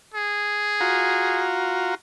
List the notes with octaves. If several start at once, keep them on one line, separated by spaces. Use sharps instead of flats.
G#4
F4 F#4 A#5